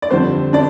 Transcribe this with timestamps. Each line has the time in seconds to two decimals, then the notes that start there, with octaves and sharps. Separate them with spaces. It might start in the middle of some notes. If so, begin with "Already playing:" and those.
0.02 D5
0.10 F2 D3 G3 C4 C5
0.53 D4 D5